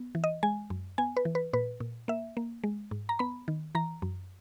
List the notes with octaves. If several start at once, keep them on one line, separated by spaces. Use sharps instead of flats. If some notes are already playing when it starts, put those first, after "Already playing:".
Already playing: B3
E3
D#5
G#3 G#5
F#2
B3 G#5
B4
E3
B4
A#2 B4
A#2
A#3 E5
A#3
G#3
G#2
A#5
B3 B5
D#3
E3 A#5
F#2